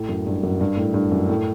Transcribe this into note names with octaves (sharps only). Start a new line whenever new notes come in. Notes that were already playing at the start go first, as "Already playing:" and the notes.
Already playing: A2
F#2
G2
F#2
G2
A2
G2
F#2
A2